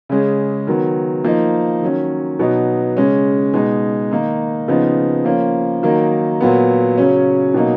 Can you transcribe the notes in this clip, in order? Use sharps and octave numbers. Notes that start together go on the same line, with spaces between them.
C#3 G#3 C#4
D#3 F#3 B3
F3 A#3 D#4
D#3 F#3 C#4
B2 F#3 B3 D#4
C#3 G#3 C#4
B2 G#3 D#4
D#3 A#3 D#4
C#3 F3 B3 D#4
F3 A#3 C#4
D#3 F#3 A#3 D#4
A#2 F#3 B3
C#3 F#3 C#4
B2 F#3 A#3 D#4